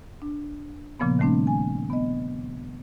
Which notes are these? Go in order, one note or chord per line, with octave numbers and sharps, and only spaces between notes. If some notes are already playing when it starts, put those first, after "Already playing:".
D4
A#2 C#3 F3 A#3 B3
D#3 G3 A3 C4 D4
G#5
B3 D#5